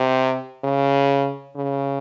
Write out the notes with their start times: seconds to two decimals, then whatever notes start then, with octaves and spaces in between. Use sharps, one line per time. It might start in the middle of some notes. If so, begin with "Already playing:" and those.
Already playing: C3
0.64 C#3
1.56 C#3